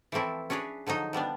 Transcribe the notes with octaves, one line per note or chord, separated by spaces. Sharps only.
E3 F3 A3 C4 E4
C#4 D4 G#4 B4 C#5
D3 F3 F#3 D#4
F3 G3 B3 D4